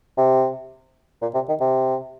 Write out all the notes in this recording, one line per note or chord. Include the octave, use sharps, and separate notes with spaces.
C3
A#2
C3
D#3
C3